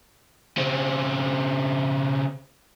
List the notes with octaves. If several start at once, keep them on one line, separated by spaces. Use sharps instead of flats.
C#3 C4